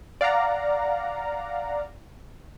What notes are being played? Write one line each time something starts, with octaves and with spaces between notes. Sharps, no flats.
D5 F5 F#5 A#5